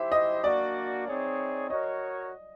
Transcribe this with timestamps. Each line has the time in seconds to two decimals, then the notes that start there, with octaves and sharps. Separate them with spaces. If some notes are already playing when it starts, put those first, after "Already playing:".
Already playing: E4 G4 C5 E5
0.12 D#5
0.43 A#3 D4 F#4 D5
1.06 C4 D#4 G#4 C#5
1.70 F#4 A#4 C#5 D#5